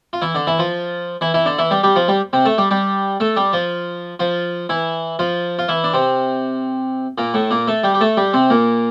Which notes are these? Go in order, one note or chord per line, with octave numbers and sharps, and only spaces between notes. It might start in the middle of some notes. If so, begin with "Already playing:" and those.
F4
E3 E4
D3 D4
E3 E4
F3 F4
E3 E4
E3 E4
D3 D4
E3 E4
G3 G4
G3 G4
F3 F4
G3 G4
C3 C4
A3 A4
G3 G4
G3 G4
A3 A4
G3 G4
F3 F4
F3 F4
E3 E4
F3 F4
F4
E3 E4
D4
C3 C4
A#2 A#3
A2 A3
A#2 A#3
A3 A4
G3 G4
G4
A3 A4
G3 G4
C3 C4
A#2 A#3